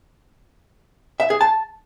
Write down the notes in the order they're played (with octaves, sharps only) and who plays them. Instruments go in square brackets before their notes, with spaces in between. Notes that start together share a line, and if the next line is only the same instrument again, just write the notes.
[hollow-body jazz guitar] E5
G#4
A5